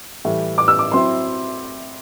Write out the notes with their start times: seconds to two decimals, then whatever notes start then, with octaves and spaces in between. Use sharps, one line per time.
0.25 A2 E3 G3
0.58 D6
0.68 E6
0.79 D6
0.91 F#3 C4 E4 C6